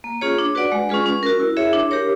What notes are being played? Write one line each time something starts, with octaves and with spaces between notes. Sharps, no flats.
A#3
C#4 F4 G#4 C#5
D4
F#4 B4 D5 F#5
G#3
C#4 F4 G#4 B4
C#4
F#4 A#4
E4
G#4 C#5 E5
D4
G4 A#4 C#5